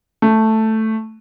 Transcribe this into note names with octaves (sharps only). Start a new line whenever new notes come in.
A3